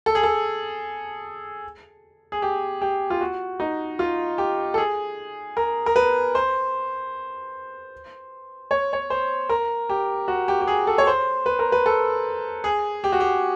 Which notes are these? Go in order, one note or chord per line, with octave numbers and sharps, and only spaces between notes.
A4
G#4
A4
G#4
G4
G4
F4
F#4
D#4
F4
G4
A4
G#4
A#4
A#4
B4
C5
C#5
C#5
C5
A#4
G4
F#4
G4
G4
G#4
A4
C#5
C5
B4
A#4
B4
A4
G#4
G4
F#4
G4